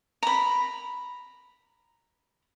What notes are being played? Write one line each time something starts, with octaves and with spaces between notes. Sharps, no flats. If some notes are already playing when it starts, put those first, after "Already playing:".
A#5 B5